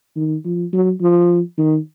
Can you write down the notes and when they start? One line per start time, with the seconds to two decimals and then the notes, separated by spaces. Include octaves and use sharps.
0.16 D#3
0.45 F3
0.73 F#3
1.01 F3
1.58 D#3